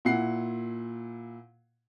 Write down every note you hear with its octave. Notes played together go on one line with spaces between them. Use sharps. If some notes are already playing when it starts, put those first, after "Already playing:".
A#2 E4 F#5 C7